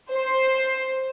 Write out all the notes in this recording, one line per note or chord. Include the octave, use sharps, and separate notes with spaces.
C5